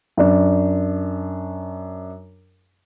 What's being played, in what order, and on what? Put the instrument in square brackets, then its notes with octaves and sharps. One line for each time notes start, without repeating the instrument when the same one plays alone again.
[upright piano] F#2 D4